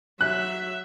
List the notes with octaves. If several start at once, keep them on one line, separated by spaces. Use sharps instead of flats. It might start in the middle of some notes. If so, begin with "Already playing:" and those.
F#3 E5 F#6